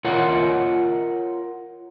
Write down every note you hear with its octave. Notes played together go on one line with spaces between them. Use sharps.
F4 A#4 C#5 F#5